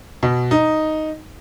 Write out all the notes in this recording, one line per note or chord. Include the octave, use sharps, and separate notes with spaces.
B2
D#4